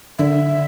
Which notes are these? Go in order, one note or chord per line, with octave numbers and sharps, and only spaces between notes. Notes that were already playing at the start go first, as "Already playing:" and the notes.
D3 E5